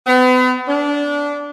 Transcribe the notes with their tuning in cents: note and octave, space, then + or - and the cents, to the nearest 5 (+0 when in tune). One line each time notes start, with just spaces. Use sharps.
B3 +40
D4 -20